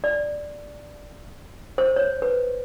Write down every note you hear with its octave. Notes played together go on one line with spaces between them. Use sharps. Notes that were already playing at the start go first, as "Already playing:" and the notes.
D5
C5
C#5
B4